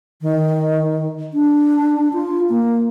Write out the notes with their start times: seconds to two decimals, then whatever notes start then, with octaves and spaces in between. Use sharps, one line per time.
0.22 D#3
1.34 D4
2.13 F4
2.49 A#3